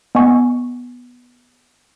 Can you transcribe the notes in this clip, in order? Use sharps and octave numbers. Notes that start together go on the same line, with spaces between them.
B3 D#5 G#5 C#6